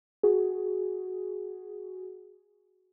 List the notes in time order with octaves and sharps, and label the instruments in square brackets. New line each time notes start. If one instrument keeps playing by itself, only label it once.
[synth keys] F#4 G#4